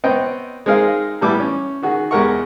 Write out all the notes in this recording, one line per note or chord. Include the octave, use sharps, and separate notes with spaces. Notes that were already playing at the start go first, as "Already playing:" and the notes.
B3 C4 C#5 D#5 G5
G#3 C4 D#4 G#4 A#4 F5
A2 E3 G3 B3 E4 D6
C#4
D#3 F#4 G#4
E2 G#3 G4 A#4 F#5 C#6